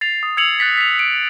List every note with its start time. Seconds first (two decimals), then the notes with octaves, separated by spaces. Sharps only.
0.01 A6 C7 F7
0.23 D#6
0.37 E6 G#6 C#7 F7 F#7
0.59 F#6 A6 B6 C#7
0.78 B6 F7
0.99 D7